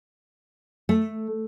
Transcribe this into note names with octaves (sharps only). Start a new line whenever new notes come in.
A3